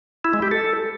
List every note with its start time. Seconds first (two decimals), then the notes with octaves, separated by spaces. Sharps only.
0.25 E4
0.34 G#3
0.42 G4
0.51 A4